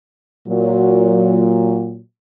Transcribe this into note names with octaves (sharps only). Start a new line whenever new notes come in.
A#2 F#3